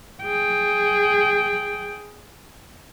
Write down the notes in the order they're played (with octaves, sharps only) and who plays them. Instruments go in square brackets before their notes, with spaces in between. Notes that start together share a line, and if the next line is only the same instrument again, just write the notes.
[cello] G#4 G5